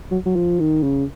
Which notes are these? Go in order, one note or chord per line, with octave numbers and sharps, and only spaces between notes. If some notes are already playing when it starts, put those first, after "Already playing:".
F#3
F#3
F3
D#3
C#3